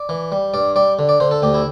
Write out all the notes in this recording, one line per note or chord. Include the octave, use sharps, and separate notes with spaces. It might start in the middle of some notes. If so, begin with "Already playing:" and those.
Already playing: D5
E3
G3
G2 D5
G3 D5
D3
D5
D3 C5
A4
D2 G4
E4